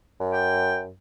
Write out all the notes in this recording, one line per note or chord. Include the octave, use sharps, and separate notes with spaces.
F#2
G5